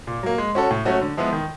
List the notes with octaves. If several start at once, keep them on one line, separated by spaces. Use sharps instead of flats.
A#2
F#3 A#3
G#3
C#4 F#4 A4
A2
F#3 A3 C#4 F#4
D3
F3 G#3 B3 E4
D#3